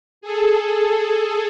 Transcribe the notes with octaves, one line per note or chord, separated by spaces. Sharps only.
G#4 A4